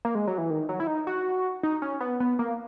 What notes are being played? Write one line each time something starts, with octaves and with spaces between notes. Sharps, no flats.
A#3
G#3
F#3
E3
D#3
F#3
E4
D#4
F#4
D#4
C#4
B3
B3
A#3